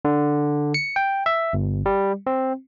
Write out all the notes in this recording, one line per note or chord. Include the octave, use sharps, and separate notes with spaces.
D3
C#7
G5
E5
G1
G3
C4